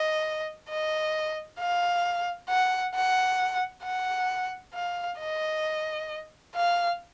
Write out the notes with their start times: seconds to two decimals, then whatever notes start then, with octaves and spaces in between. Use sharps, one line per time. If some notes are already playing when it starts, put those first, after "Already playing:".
Already playing: D#5
0.69 D#5
1.60 F5
2.49 F#5
2.95 F#5
3.84 F#5
4.74 F5
5.19 D#5
6.55 F5